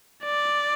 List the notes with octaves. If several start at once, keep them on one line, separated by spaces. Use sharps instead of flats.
D5